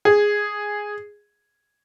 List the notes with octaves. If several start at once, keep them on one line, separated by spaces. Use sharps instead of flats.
G#4